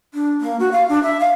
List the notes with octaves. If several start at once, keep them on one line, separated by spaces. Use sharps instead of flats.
D4
A#3
F#4
F5
D4
E5
F5